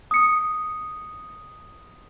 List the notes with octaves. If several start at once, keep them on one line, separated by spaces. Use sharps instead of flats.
D#6 C#7